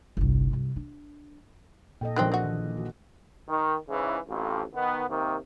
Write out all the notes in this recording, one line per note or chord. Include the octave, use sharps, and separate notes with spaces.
G1 C2
C2
D4
A#2 A4 D#5 G5
A#1 D#3 F#3 A#3 C4 F#6
C4 F#4
D#3 E3
F#4
D#3
G#2 C#3 E3
A1 F2
D#3 B3
C3 D#3 A#3 C4